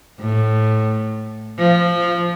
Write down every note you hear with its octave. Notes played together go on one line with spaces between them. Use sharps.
A2
F3